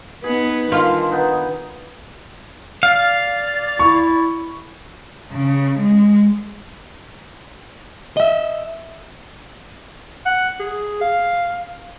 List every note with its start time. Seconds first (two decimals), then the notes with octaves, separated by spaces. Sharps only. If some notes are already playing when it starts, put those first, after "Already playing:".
0.24 B3 D#4 G#4 B4
0.72 D3 D#3 F4
1.11 B3 D#4 B4
2.83 D5 F5
3.79 E4 C#6
5.33 C#3
5.79 G#3
8.17 D#5 E5
10.26 F#5
10.60 G#4
11.01 F5